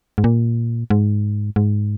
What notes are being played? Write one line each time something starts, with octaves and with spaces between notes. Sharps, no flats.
G#2
A#2
G#2
G#2